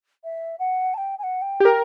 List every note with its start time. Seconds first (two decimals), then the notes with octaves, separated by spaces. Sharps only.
0.24 E5
0.59 F#5
0.94 A5
0.98 G5
1.19 G#5
1.23 F#5
1.42 G5
1.60 G4
1.65 A#4